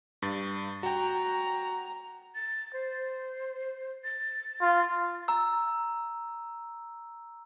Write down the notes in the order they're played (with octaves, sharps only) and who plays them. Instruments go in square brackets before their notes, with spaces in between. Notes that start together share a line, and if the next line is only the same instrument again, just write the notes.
[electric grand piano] G2 A6
[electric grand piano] F#4 G5 [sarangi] A#5
[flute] A6
C5
A6
[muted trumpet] F4
[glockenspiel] A#5 E6